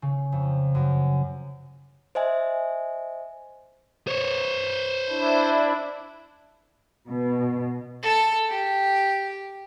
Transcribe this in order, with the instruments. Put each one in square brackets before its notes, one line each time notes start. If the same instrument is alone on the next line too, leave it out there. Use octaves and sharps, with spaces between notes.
[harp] C#3
F2
F#2
[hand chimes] C5 D#5 E5 G#5
[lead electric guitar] C5 C#5
[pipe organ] D4 E4
[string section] B2
[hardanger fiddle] A4
G4